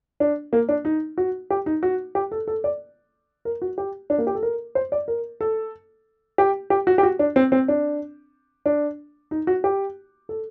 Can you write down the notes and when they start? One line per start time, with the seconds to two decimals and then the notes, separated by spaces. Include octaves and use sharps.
0.20 D4
0.53 A#3
0.69 D4
0.85 D#4
1.18 F#4
1.50 G4
1.66 D#4
1.83 F#4
2.15 G4
2.32 A4
2.48 A4
2.64 D5
3.45 A#4
3.62 F#4
3.78 G4
4.10 D4
4.18 A#3
4.27 G4
4.35 A4
4.43 A#4
4.75 C5
4.92 D5
5.08 A#4
5.41 A4
6.38 G4
6.70 G4
6.87 F#4
6.98 G4
7.03 F#4
7.19 D4
7.36 C4
7.52 C4
7.68 D4
8.66 D4
9.31 D#4
9.47 F#4
9.64 G4
10.29 A4